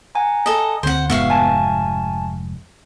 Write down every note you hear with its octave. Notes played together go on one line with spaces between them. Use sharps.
F#5 G#5 A#5
A4 D#5
D2 C4 C5 F#5
F1 G#2 B3 F#4 E5 F5
G#5 A5